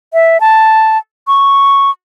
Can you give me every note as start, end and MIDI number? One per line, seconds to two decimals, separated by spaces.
0.13 0.40 76
0.40 0.98 81
1.27 1.90 85